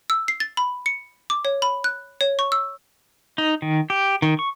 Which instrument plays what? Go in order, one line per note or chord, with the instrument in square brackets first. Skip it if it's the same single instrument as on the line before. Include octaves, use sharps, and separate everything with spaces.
[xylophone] E6
C7
A6
B5
C#7
D6
C#5
B5
F#6
C#5
C#6
E6
[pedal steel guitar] D#4
D#3
G4
D#3
C#6